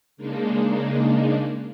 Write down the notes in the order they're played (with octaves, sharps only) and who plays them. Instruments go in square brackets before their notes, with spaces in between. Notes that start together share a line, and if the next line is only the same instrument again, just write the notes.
[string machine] C#3 G#3 A#3 D4 D#4